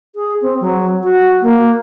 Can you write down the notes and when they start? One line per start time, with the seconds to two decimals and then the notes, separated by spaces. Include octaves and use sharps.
0.15 G#4
0.42 C4
0.61 F#3
1.04 F#4
1.42 A#3